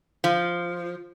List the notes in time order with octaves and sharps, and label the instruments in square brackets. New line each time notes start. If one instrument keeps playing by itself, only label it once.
[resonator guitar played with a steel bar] F3